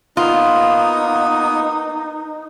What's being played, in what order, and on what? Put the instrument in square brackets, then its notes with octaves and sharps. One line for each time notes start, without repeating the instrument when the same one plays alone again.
[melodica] A#3 B3 D#6 [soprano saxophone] D#4 [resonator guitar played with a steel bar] F4